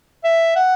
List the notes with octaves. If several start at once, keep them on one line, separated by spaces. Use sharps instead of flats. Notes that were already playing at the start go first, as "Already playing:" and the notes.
E5
F#5